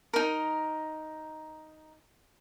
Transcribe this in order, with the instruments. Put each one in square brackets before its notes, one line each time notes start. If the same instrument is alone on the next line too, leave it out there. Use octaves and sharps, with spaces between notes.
[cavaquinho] D#4 A#4